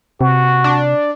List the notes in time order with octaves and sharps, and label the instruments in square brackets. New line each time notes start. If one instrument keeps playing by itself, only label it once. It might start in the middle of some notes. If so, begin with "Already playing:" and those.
[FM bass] C3 [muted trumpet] F#4
[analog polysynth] D4